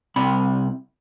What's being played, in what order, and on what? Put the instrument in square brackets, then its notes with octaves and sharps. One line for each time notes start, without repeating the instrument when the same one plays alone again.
[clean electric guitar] C2 C4 B5